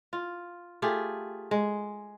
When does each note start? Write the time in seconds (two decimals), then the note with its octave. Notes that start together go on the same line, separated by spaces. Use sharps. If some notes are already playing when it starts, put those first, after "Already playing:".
0.13 F4
0.82 A3 F4 G4 G#4
1.51 G#3